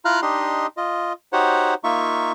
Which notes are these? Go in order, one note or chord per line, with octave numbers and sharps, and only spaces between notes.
E4 F4 F5 A#5 F6 F#6
D4 D#4 G4 D#5 C6
F4 D#5
D#4 F#4 G4 C5 C#5 F#5
A#3 D#4 F4 E5 C#6